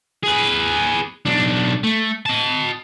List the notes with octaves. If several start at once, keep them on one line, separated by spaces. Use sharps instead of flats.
G#4 B4
B1 D4
A3
D#5 A5